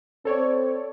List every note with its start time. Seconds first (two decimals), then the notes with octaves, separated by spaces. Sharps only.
0.25 C4 A4 C#5 D5